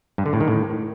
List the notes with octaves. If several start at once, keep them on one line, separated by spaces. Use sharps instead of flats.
G2
D3
A2
D#3
A2